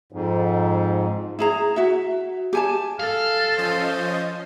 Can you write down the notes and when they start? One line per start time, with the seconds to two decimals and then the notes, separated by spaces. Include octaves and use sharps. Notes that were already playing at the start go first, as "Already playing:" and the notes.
0.12 F2 G#2
1.39 E4 G#4 A#5
1.76 F#4 E5
2.53 G4 G#5 A5
3.00 A4 F5 F6
3.58 F3 C#4 C5 D#5